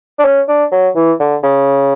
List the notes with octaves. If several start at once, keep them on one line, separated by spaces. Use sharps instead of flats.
D4
C#4
D4
F#3
E3
D3
C#3